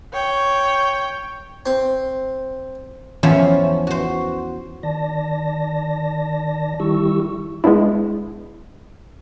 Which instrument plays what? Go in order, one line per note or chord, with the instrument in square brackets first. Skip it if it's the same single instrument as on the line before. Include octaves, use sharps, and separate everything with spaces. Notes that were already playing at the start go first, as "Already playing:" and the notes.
[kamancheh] C#5 G5
[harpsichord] C4
[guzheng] E2 F3 C#4 E4 C5 B5
F#4 C5
[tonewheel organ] D#3 D5 A5 A#6
D#3 G3 E4 G4 C#6 E6
[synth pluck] G#3 B3 D4 E4